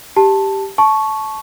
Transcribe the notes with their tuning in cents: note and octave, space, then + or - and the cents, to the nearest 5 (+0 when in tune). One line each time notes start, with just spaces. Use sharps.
G4 +0 A5 +0
A5 -20 C#6 +0